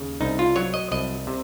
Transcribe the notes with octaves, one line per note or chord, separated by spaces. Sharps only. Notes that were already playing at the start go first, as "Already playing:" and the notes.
Already playing: D#2 C#3
C2 D#4
F4
F#3 C#5
D#5
C2 D#5
C3